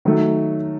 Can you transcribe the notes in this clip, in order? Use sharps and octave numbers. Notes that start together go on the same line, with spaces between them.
D#3 F#3 A3